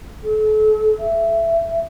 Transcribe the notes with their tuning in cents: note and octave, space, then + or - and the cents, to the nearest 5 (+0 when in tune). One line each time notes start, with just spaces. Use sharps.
A4 -40
E5 +20